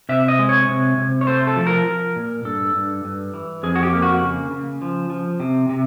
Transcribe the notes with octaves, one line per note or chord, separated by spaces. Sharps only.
C3 E5
D#5
G#3
C#5
C3
C3
C#5
A3 C5
A4
F3
A#4
F3
A#2
G2 A4
G2
G2
E3
F2 G#4
F#4
G4
A#3
F#4
C#3
C#3
F3
F3
C3
C3